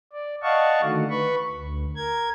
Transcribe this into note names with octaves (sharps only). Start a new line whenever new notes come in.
D5
D5 D#5 F5 F#5 A5 C#6
D3 D#3 A3 F#4
B4 B5 C#6
D2
A#4 G#6